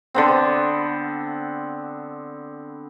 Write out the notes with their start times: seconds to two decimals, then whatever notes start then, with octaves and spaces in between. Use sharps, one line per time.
0.14 D3 B3 C4